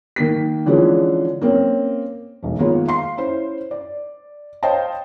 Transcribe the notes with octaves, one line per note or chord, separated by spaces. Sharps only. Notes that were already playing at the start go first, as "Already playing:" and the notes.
D#3 A#3 B6
D3 E3 F3 G#3 C#4 G#4
A#3 C4 C#4 C#5
E1 B1
D#3 G#3 A#3 B3 F4 C#5
F5 C6 C7
C#4 E4 C5
D5
C5 C#5 D#5 F5 G5 A5